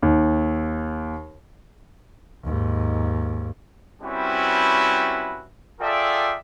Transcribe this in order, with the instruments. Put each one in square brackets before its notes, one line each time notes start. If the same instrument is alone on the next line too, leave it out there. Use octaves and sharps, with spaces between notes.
[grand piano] D#2
[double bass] D#2 G#2
[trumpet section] G3 C4 C#4 E4 F#4 B4
F4 G#4 A4 D5 E5 G5